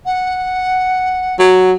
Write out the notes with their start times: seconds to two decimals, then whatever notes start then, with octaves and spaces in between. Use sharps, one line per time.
0.06 F#5
1.39 F#3